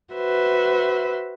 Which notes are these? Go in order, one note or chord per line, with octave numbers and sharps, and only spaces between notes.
F#4 B4 C5 E5